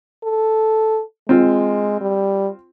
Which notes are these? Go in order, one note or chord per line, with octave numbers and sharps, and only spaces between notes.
A4
G#3 C4 F4
G3